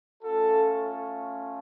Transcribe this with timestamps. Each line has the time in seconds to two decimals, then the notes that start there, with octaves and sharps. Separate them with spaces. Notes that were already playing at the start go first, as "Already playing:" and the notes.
0.22 A3 C#4 F4 A4